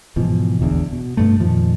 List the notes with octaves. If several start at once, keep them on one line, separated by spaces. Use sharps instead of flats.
G#2 B2 E3 F3
E1 A1 E2 D3
B2
G2 B2 A3
F2 A#2 D#3 F3